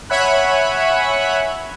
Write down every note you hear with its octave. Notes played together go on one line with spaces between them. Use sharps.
C#5 E5 F#5 G#5 B5 F#6